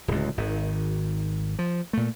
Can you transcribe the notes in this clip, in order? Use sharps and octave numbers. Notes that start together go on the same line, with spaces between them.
D1 C#2
G#1 D#3
F3
A#2 A3